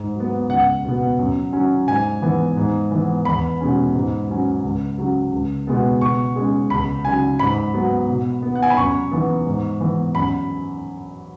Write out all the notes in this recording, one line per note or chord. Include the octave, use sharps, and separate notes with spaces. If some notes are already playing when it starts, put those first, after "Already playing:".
Already playing: G#2
F#3 B3
C#2 F#5
B2 B3
F#2
F#3 C#4
G#2 G#5
E3 B3
G#2
E3 B3
E2 B5
B2 G#3 C#4
G#2
F#3 C#4
C#2
C#3 F#3
C#2
B2 G#3 B3
B2 C#6
G#3 C#4
C#2 B5
C#3 F#3 G#5
G#2 B5
F#3 B3
B2
B3
F#5
G#5
B5
F#2 C#6
E3 B3
G#2
E3 B3
F#2 B5